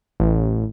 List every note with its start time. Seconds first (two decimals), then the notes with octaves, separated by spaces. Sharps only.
0.20 A1